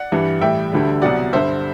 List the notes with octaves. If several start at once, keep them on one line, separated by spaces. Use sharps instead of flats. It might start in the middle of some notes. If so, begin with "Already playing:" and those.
Already playing: D5 F#5
G2 E3 G3
A2 E3 G3 E5 G5
D2 D3 G3
C2 B2 F#3 D5 F#5
G2 D3 G3 C5 E5